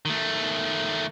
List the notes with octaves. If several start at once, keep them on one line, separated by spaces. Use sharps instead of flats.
D#3 A3